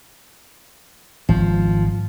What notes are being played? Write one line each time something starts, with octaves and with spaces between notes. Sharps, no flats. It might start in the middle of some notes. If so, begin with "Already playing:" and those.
G#1 F3